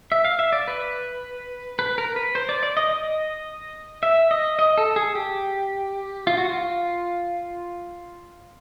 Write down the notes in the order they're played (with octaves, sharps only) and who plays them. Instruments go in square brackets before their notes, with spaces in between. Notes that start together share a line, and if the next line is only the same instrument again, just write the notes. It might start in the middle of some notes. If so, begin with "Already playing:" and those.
[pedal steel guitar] E5
F5
E5
D5
B4
B4
A#4
B4
C5
D5
D5
D#5
D#5
E5
D#5
D#5
A4
G#4
G4
F4
F#4
F4